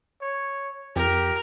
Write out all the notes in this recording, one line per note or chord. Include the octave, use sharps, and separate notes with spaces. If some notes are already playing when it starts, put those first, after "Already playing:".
C#5
F2 G4 A#4